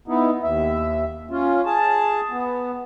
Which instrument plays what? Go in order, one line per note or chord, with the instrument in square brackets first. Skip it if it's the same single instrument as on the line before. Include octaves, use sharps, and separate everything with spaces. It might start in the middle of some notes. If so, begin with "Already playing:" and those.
[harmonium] B3 D#4 E4
D#2 E5
C#4 F4
G#4 A5
B3